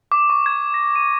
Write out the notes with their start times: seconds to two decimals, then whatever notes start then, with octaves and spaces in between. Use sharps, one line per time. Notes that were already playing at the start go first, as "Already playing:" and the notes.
0.12 D6
0.30 C#6
0.46 G#6
0.74 A#6
0.96 D#7